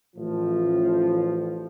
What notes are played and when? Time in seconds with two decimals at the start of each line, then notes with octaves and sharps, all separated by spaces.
0.16 A1 A2 F3